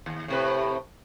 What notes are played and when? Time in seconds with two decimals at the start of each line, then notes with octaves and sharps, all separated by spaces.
0.06 D#2
0.28 A2 C3 B4